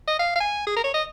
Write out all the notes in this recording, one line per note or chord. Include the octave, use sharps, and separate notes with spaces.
D#5
F5
F5
G#5
G#4
A#4
C#5
D#5